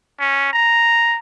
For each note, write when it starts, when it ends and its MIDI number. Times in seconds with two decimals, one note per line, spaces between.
0.19 0.51 61
0.53 1.19 82